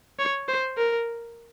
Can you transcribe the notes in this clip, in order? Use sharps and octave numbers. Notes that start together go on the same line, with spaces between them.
C#5
C5
A#4